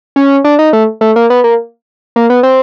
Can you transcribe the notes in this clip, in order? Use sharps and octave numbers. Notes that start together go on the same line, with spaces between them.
C#4
D4
D#4
A3
A3
A#3
B3
A#3
A#3
B3
C4